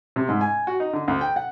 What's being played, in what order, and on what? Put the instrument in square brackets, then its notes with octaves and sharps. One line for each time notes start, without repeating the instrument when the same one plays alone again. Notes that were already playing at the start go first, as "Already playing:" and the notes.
[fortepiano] C3
G#2
G#5
F#4
D#4
D3
D2
G5
F#5